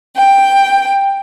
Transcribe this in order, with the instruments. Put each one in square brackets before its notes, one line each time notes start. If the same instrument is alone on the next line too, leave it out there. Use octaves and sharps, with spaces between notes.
[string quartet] G5